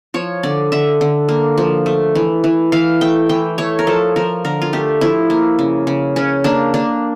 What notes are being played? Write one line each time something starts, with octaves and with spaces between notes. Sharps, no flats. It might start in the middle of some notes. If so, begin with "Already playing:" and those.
F3 C#5
D3 D5
D3 E5
D3
A#3
F3
A3
E3
E3
E3 F5
A3 G5
E3 G5
A3 C#5
A#4
F3 A4
F3 A#4
D3 A#4
F4
A3 G4
F3 E4
A#3
C#3
C#3
C#3 C#4
A#3 D4
A#3 D4